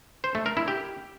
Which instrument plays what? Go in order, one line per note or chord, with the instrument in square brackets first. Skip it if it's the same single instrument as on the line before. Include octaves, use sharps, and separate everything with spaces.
[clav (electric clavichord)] C5
A3
A#4
E4
G4